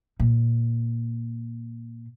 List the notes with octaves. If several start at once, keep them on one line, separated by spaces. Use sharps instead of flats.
A#2